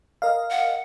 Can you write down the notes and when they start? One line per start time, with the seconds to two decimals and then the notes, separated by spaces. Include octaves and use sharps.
0.22 A#4 D#5 F5
0.51 F#5